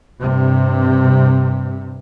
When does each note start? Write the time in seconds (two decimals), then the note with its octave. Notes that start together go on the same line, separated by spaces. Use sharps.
0.21 G2 C3